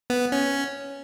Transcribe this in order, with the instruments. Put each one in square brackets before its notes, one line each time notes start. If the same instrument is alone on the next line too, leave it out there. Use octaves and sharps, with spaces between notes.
[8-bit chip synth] B3
C#4